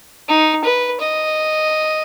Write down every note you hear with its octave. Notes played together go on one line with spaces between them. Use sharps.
D#4
B4
D#5